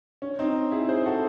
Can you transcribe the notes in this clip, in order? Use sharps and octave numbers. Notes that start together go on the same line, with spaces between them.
C#4
C4 D#4
E4 G#4
G#4 C5
F#4 A4